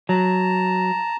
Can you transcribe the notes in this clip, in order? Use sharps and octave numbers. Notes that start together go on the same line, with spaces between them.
F#3 A5 A#5